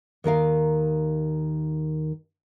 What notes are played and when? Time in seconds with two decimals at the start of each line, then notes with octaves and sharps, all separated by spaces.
0.24 D#2 D#3 A#4 F5